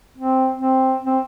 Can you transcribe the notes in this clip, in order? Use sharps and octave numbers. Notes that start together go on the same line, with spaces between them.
C4
C4
C4